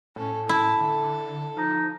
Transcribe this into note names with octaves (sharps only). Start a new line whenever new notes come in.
A2 C#4 A4
E4 A5
D3 A4
F3 D#4